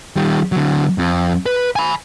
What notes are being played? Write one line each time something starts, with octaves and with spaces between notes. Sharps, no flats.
D#3 G3
D3 F#3
F2
B4
G#5 B5